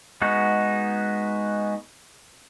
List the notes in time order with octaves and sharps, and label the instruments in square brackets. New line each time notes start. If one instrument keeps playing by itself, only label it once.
[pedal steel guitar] G#3 B3 D#4 F#4